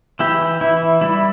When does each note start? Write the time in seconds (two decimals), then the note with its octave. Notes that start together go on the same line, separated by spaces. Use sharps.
0.19 E3 E4 G4
0.61 E3 E4
1.01 G3 E4